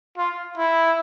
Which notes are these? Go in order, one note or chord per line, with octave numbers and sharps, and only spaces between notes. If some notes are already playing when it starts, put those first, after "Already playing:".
F4
E4